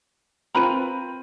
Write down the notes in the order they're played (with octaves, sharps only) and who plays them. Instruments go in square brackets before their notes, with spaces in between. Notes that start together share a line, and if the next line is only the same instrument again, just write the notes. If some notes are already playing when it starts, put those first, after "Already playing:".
[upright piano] C4 F4 D#7 [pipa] A#4 B4